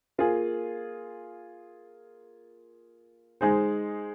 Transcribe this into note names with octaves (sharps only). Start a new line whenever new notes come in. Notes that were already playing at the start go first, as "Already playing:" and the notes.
A#3 F4 G#4
G#3 D#4 G#4 C5